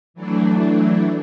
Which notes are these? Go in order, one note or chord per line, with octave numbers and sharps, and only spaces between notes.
E3 F#3 A3 D4